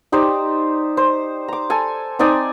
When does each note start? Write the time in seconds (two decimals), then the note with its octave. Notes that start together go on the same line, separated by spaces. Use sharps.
0.12 D#4 G4 C5 D5
0.97 C5
1.48 A#5 D6
1.70 A4 G#5
2.19 C4 D#4 D5 G#5